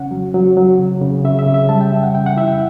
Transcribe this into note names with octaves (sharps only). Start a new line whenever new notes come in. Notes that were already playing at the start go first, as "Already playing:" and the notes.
Already playing: C#3 C#4 F#5
F#3
F#3
F#3
C#3
C#3
C#3 E5
E5
C#3
E5
G3 A5
G5
C#4 E5
F#5
C#3 G5
F#5
E4 E5
G5